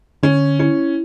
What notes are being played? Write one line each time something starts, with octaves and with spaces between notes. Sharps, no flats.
D3 C#4
C#4 E4